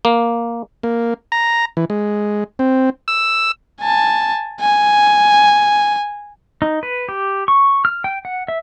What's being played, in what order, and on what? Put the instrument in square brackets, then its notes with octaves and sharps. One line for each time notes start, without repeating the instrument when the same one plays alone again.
[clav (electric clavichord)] A#3
[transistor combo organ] A#3
A#5
E3
G#3
C4
E6
[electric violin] G#5 A5
G#5
[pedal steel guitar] D#4
B4
G4
C#6
F6
G5
F#5
E5